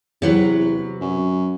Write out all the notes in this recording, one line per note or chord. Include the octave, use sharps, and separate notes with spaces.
E2 C3 F#3 B4
F#2